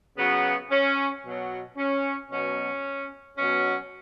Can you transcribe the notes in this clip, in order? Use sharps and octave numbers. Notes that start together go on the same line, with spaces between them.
C#3 F#3 B3
C#4
B2 F#3
C#4
B2 F#3 C#4
B2 F#3 C#4